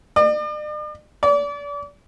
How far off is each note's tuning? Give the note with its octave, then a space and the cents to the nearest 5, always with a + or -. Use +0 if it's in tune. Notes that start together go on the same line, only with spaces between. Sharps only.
D5 +45
D5 -35